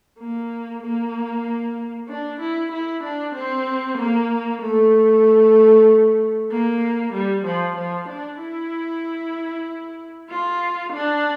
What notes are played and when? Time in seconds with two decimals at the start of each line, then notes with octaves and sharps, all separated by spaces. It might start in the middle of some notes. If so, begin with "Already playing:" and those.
0.19 A#3
0.82 A#3
2.09 D4
2.40 E4
2.72 E4
3.03 D4
3.35 C4
3.98 A#3
4.62 A3
6.51 A#3
7.13 G3
7.45 F3
7.77 F3
8.08 D4
8.40 E4
10.29 F4
10.93 D4